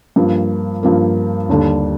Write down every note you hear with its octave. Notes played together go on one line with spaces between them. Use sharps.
G2 F3 A#3
G2 F3 A#3
D#2 D3 G3 D4 A4